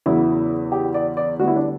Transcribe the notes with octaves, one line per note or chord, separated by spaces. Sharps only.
E2 C#3 F#3 B3 E4
G4
D5
D5
D2 D3 G3 B3 F#4
E4
D4